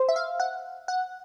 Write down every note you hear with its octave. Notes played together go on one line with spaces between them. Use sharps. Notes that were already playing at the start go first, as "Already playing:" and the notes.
Already playing: C5
E5
F5
F#5
F#5